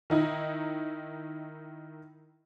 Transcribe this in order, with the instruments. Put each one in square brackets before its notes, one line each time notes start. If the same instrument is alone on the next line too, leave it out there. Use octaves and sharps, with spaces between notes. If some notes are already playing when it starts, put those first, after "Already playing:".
[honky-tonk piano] D#3 D#4 E4